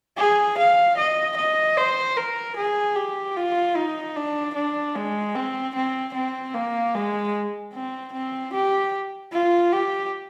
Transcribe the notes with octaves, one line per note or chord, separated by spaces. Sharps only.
G#4
F5
D#5
D#5
C5
A#4
G#4
G4
F4
D#4
D4
D4
G#3
C4
C4
C4
A#3
G#3
C4
C4
G4
F4
G4